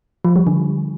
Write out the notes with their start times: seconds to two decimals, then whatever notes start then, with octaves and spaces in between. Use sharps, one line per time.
0.25 F3
0.36 G3
0.47 D3